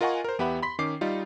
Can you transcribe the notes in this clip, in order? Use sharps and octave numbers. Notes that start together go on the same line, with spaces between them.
F4 A#4 D#5 F#5 G#5 C#6
A#4 C5
E2 B3 G4 E5 F#5 B5
B5 C6 B6
D#3 C#4 D6 C7
G3 D#4 F4